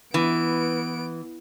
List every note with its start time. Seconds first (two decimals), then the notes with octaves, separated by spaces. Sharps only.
0.14 E3 B3 D7